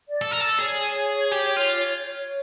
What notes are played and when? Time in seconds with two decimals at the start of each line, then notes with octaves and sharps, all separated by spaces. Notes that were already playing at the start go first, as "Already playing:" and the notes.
0.09 D5
0.21 A4
0.31 A#4 D5
0.40 A4
0.58 G#4 C#5
1.32 G4
1.56 F4
2.05 C#5